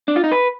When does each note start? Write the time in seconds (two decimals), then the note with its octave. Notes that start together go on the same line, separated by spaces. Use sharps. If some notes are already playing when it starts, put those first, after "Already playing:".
0.08 D4
0.16 F4
0.24 D#4
0.32 B4